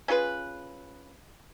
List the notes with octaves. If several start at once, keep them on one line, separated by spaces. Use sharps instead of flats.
C#4 F4 G#4 B4